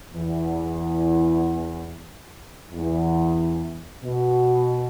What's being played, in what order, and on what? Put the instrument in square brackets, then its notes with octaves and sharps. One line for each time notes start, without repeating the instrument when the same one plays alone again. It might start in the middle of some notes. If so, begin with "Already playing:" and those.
[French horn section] E2
E2
B2